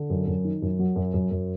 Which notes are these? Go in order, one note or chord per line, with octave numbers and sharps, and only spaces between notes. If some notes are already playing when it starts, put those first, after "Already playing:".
Already playing: D3
F#2
F#2
D#3
F#2
F#3
F#2
F#2
F#2